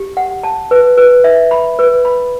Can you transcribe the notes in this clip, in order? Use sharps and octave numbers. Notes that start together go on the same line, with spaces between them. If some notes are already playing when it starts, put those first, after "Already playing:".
Already playing: G4
F#5
A5
B4
B4
E5
B5
B4
B5